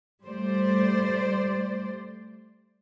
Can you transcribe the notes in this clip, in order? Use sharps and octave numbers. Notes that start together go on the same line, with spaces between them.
G3 A3 C5 D5